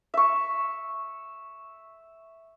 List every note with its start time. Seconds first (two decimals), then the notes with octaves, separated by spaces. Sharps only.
0.14 E5 C#6